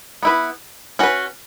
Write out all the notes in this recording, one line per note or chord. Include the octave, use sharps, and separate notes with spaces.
B3 E4 B4
C#4 F#4 B4